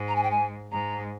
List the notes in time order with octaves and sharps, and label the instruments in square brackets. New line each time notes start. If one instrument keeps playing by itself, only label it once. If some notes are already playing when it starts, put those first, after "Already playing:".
Already playing: [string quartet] G#2
[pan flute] A#5
G#5
G5
G#5
[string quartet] G#2 [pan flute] A#5